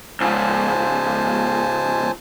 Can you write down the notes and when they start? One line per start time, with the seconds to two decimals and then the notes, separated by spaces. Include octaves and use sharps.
0.20 C#2 G#2 C5 G#5 A5